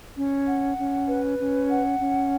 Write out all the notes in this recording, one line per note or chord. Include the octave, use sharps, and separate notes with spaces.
C#4
F#5
C#4
B4
C#4
F#5
C#4